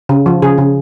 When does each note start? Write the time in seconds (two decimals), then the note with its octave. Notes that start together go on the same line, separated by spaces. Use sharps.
0.09 C#3
0.26 F3
0.42 C#3 G#4
0.58 C#3